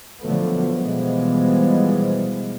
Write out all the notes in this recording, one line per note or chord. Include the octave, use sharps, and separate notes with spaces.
D3 F3 F#3 A3 B3
B2 E3 F3 G3 G#3 B3